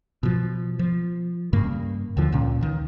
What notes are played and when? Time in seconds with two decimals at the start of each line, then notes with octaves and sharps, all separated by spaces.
0.23 B2 F3
0.79 F3
1.53 G2 C#3 A#3
2.17 D#2 D3 F3
2.32 C#2 A#2 C#4
2.61 C#2 D#3